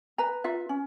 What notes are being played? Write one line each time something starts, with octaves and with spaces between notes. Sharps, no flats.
B4 A#5
F4 E5
C#4